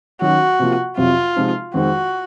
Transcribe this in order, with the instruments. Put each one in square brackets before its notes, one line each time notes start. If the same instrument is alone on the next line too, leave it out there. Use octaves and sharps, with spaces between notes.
[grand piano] D#3 F#3 C#4 [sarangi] F#4
[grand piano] C3 F3 A#3 F4
[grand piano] F2 C3 F#3 [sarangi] F4
[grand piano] C3 F3 G#3 C4 D#4
[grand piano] F2 D#3 G#3 C4 [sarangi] F#4